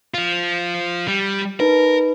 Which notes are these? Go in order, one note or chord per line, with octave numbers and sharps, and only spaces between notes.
F3 F4
G3
D#4 A#4 B4